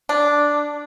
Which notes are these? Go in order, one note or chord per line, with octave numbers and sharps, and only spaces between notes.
D4